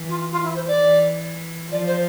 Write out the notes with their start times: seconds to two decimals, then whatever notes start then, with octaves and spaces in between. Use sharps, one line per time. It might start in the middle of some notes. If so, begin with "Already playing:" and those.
Already playing: E3
0.09 F4
0.32 E3 F4
0.44 E4
0.55 C5
0.67 D5
0.79 E3
1.72 F3 D5
1.87 C5